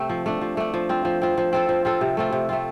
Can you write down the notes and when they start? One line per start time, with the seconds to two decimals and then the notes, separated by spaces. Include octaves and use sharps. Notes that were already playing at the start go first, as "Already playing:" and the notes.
Already playing: C3 A3 C4
0.09 F3
0.26 A3 D4
0.41 F3
0.57 A3 D4
0.74 F3
0.89 C4 F4
1.05 F3
1.22 C4 F4
1.38 F3
1.53 C4 F4 A4
1.69 F3
1.85 C4 F4 A4
2.01 C3
2.17 A3 C4 F4
2.32 C3
2.49 A3 C4 F4